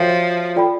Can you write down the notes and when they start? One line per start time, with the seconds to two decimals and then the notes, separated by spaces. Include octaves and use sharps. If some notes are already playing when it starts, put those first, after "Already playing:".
Already playing: F3 F#4 A4 C#5 E5 G5
0.56 F4 A4 D5 G5 B5